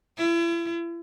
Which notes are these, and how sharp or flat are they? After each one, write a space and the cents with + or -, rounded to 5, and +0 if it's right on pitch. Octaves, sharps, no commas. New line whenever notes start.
E4 +40